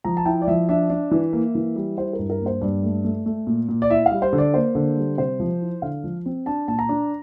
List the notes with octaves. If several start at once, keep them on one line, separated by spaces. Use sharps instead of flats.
F3 A#5
A5
E4 G5
D5
F3 E5
D4 E5
D4
E3
A#3
E3
G3
E4 C5
A#4
G2
A#4
A#3
C5
G2 D5
A3
A3
A3
A#2
A#2
D5
E4 E5
F5
G3
C5
D3
D5
A#3 C5
D3
G3
C3 C5
F3
E4
D3 F5
F3
C4
D4 A5
A#2 A5
A#5
D4